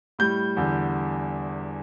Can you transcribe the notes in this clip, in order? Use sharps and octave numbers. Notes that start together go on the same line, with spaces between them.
A2 G3 G6
E2 D3 G3